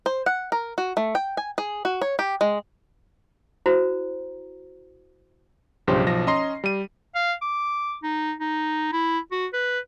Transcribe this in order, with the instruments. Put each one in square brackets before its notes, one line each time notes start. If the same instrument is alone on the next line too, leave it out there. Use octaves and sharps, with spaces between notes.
[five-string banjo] C5
F#5
A#4
F#4
A3
G5
G#5
G#4
F#4
C#5
G4
G#3
[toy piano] E4 F#4 C5 A#5
[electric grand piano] B1 G2 C#3 F3 G4 C5
B1 F3 A#6
C#4 D#5 A#5 C6 C7
G3 D#7
[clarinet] F5
D6
D#4
D#4
E4
F#4
B4